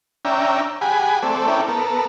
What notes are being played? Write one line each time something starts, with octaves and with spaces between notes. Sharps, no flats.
C#4 D4 E5 G5 A#5
G4 G#4 F#5 G#5 B5
A3 C4 A4 D5
C#4 E4 A4 A#4 D5 G5
B3 A4 A#4